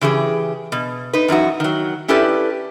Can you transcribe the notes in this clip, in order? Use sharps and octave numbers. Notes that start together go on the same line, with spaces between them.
C#3 E3 G4 G#4
B2
D#4 B4
F#2 E3 D#4 F#4
D#3 F#3
C#4 E4 G4 A4 B4 D5